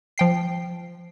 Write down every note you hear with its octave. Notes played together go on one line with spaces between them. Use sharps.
F3 G5 C7